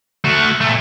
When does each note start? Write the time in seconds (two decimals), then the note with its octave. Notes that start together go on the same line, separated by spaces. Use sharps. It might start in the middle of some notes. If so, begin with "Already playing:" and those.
0.24 A3 F#4
0.61 A#2 A3